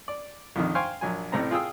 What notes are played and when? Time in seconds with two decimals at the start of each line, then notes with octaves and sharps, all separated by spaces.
0.08 D5
0.56 A#1 F2 D#3
0.75 C5 F5 G5 G#5 C6 C#6
1.01 A#1 F#3 G#5
1.32 A1 A2 C3 C4 A#5
1.51 F4 G#4 G5 D#6 E6